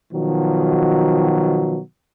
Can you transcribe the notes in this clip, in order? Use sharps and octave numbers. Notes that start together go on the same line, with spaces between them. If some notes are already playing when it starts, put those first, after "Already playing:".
B2 D#3 F3 F#3